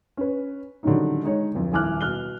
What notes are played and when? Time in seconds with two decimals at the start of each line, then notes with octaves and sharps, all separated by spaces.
0.17 C#4 B4
0.83 D3 D#3 F#3 G3 C#4 D#4
1.24 G#3 D#4 C#5
1.54 D1 F2
1.72 D#1 E4 G#5 D6 F6 F#6
2.01 B2 F6 F#6 G7